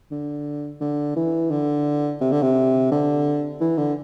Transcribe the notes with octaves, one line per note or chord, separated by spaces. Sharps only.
D3
D3
E3
D3
C3
D3
C3
D3
E3
D3